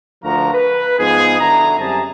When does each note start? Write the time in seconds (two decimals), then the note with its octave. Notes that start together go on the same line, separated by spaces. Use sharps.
0.23 D2 F3 F4 F#4 A#4 A#5
0.53 B4
0.98 G#2 F3 B3 D#4 G#4
1.39 D3 E4 F#4 A#5
1.78 F#2 G3 C4 G#4 A5 A#5